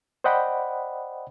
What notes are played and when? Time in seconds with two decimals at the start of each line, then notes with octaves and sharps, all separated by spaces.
0.24 C5 D5 D#5 F#5 G5 B5